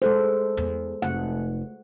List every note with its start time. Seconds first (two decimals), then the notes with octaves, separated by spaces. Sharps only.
0.02 G#3 A4 C5
0.57 E2
1.02 F1 F#5